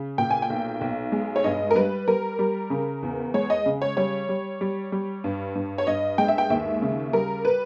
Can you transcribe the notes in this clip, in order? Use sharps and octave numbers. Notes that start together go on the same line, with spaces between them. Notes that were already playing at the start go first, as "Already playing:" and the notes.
Already playing: C#3
A#2 G5
G#5
G5
B1
B1
G#3
C#5
G2 D#5
A#4
G3 B4
G3 A#4
G3
C#3
E2
G#3 C#5
D#5
C#3
C#5
G3 C#5
G3
G3
G3
G2
G2
C#5
G2 D#5
G#3 G5
E5
G5
D#2 E5
C#3
G3 A#4
B4